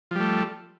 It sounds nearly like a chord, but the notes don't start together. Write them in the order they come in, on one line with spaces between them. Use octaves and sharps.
F3 G3 A3